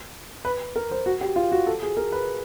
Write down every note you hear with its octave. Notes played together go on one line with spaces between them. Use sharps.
B4
A#4
C5
F#4
G4
F4
F#4
A4
G#4
A#4
B4